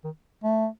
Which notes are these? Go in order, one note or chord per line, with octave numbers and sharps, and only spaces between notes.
D#3
A3